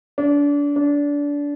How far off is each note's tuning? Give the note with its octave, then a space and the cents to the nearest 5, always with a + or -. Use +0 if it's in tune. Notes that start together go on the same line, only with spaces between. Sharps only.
D4 -30
D4 -25